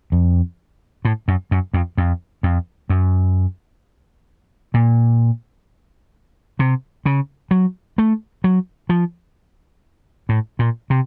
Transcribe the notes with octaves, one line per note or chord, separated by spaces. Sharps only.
F2
A2
F#2
F#2
F2
F2
F2
F#2
A#2
C3
C#3
F#3
A3
F#3
F3
A2
A#2
C3